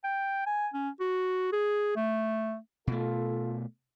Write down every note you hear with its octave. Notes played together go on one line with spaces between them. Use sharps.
G5
G#5
C#4
F#4
G#4
A3
B2 A3 F4 A4